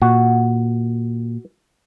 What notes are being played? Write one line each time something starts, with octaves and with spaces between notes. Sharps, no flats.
A#2 F#4